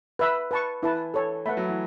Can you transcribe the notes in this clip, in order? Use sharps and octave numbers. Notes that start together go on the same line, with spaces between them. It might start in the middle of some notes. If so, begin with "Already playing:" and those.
B4 E5 B5
B4 A5 C#6
E3 E4 B4 A5
A4 C#5 A5
A3 B4 F#5 B5
F#3
E3